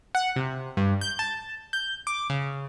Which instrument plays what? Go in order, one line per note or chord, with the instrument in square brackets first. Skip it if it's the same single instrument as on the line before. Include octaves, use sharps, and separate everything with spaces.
[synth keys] F#5
C3
G2
G6
A5
G6
D6
C#3